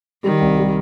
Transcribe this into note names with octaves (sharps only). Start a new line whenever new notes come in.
D#3 G3
C2
G3